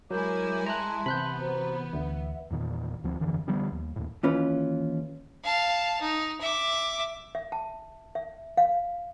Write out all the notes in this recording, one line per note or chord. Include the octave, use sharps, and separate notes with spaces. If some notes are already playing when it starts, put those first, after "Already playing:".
F#3 G#3 E4 A#4 G#5 D6 G6
E5 A5 A#5 C6 F#6
C3 E3 B3 B5 F#6 G6
F#4 C5 A#5
D2 B4 E5 F#5
E2 A#2 D#3
D2 F3 C4
F#1 E2 D3 E3
D3 F3 G3 B3
D#2
D#2 A2
D#2 E3 C#4 F4 B4
F5 A5
D#4
E5 D6
E5
A5
E5
F5